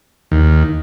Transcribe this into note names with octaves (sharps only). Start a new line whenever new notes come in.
D#2